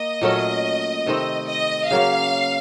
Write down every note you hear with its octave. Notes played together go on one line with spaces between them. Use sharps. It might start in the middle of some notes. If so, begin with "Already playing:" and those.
Already playing: A#3 D#5
A#2 F#3 A3 C#4
C3 D#3 A3 C4
D#5
C#3 F#3 A#3 C#4 F5